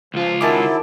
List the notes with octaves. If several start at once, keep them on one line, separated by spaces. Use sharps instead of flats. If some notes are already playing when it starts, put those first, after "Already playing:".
C#2 F3 F4
D#3 F#3 G#3 E4 A5 D6